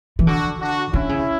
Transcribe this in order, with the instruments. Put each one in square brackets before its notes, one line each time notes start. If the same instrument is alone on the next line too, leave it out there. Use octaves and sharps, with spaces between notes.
[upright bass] E3
[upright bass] D3 [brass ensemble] D4 F#4
[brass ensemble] D4 F#4
[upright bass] D3 [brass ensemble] C#4 E4
[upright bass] C#3